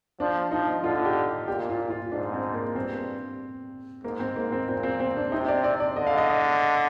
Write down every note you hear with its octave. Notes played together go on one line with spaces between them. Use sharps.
F3 D4
F3 D#4
D3 F4
G4
A#2 G4
F4
F4
G#2 D4
C4
A#3
G2 C4
G#2 A#3
C4
G#2 A#3
C4
A#2 C4
C4
C4
D4
C3 D#4
D5
D5
D5
D3 D#5
F5
D#5
D#5